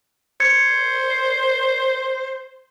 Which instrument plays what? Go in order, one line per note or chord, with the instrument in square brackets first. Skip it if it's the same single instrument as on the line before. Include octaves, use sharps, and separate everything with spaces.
[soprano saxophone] C5 [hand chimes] G#6 C#7